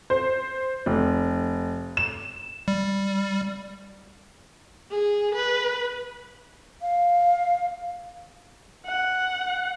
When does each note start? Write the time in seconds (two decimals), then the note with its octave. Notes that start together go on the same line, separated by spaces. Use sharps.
0.10 C5
0.86 F1
1.97 E7
2.68 G3
4.91 G#4
5.35 B4
6.82 F5
8.86 F#5